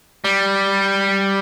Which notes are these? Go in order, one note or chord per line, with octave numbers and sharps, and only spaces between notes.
G3